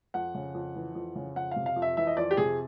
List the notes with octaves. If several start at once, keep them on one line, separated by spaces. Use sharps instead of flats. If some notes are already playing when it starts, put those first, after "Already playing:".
F2 F#5
C#3
F2
E3
F2
C#3
F2 F#5
C3 F5
F5
F2
E5
E3 E5
D#5
F2 D5
G4
C3 G#4